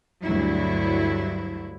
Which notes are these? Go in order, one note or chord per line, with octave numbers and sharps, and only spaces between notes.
D2 G2 F#3 E4